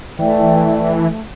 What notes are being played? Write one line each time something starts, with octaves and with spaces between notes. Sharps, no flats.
E3 A3 D5 E5 G5